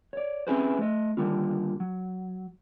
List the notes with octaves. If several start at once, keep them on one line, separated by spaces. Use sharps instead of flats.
C#5 D5
C4 C#4 E4 G#4 B4 C5
A3 D#5
D3 D#3 G3 A#3 C4 F4
F#3